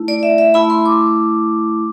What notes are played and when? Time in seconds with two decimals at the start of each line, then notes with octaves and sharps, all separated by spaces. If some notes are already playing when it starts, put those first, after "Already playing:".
Already playing: A3 E4
0.08 D5
0.23 E5
0.38 E5
0.54 A3 E4 B5
0.70 C6
0.85 D6